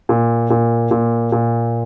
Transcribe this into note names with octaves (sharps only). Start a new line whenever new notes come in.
A#2
A#2
A#2
A#2